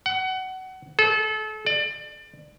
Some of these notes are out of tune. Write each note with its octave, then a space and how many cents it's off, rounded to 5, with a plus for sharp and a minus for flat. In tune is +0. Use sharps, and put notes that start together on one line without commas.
F#5 +25
A4 -30
D5 +25